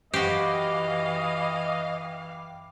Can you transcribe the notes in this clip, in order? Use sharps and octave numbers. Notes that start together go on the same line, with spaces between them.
F#2 E3 F#4 G4 D#5 F5 G5 D6